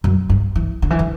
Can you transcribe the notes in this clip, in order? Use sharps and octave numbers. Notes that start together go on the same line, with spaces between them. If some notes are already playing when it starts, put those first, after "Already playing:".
F#2
G2
E3
D3
E3
D3